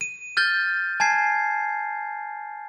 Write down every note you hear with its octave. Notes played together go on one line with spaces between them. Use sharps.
D#7
F6 G6 A6 G7
G#5 A5 G#6 C7